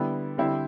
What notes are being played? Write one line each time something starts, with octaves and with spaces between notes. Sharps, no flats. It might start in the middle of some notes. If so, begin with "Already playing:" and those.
Already playing: D3 G3 B3 E4
D3 G3 C4 E4